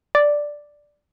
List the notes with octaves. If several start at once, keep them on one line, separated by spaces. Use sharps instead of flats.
D5